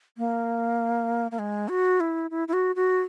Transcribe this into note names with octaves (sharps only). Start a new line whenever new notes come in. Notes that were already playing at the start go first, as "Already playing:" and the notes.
A#3
A#3
G#3
F#4
E4
E4
E4
F#4
F#4